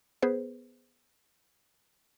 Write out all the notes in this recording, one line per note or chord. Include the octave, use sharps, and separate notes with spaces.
B3 G#4 B4 C5